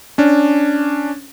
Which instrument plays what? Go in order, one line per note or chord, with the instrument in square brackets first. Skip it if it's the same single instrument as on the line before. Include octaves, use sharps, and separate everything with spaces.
[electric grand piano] C#4 D4